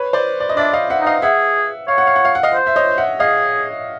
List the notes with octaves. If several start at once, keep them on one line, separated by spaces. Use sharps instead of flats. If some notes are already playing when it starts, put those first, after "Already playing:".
Already playing: B4 C#5
C5 D5
D5
D#5
D4 D5 E5
D#5 F5
E5 F#5
D#4
D#5 F5
G#4 E5 F#5
C#5 F5
F#5
F5
F#5
F5
F#5
D#5 F5
C5
E5
C#5 D#5
E5 F#5
G#4 D#5 F5